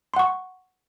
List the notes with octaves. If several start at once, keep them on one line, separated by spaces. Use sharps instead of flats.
F#5 C6 C#6